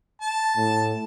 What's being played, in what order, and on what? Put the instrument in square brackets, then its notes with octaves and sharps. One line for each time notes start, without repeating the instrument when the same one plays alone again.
[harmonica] A5
[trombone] A2